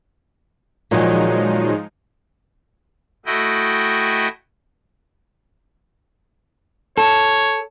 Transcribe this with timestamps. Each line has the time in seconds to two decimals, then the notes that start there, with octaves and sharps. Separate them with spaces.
0.91 A#2 D#3 F3 F#3 G#3 D#4
3.26 A3 E4 F#4 D#5 G5
6.98 A4 C#5